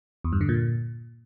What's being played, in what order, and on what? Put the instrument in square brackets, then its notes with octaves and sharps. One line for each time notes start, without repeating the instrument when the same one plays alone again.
[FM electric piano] E2
G2
D3
A#2